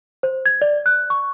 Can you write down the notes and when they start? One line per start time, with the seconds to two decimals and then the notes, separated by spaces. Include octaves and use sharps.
0.23 C5
0.46 G#6
0.62 D5
0.86 F#6
1.10 C#6